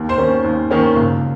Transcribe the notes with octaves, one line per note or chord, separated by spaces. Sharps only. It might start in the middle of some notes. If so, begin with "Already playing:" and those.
Already playing: D#2
C5 C6
D#3 A#3 C#4
D#2
D#3 A#3 C#4
C#2